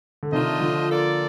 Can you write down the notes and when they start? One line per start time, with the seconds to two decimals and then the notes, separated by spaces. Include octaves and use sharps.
0.23 D3
0.32 C3 D#3 A3 D4 F4 C5 D#5
0.60 D3 F3
0.89 A#3 F4 A4 D5